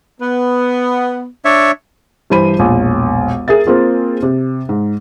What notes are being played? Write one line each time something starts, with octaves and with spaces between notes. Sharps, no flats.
B3
D4 C#5 E5
G2 E3 C5 B5 D#7
E1 A#1
G#4 A#4 E5 A6
A#3 C4 F4 G#4
C3
G#2